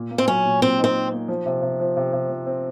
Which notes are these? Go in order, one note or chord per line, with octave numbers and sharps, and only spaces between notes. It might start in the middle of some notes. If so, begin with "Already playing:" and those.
Already playing: A#2
A#3
C4
F#3 C#4
A#2
A#2 C4
D#4
C4
D#4
A#3
F3
C3
C3
F3
C3
C3
F3
C4